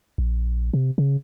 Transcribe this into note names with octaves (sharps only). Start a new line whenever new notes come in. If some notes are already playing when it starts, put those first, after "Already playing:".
A#1
C3
C#3